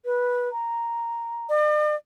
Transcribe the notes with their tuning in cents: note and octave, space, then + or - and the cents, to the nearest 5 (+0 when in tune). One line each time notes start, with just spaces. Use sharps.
B4 -15
A#5 +0
D5 +45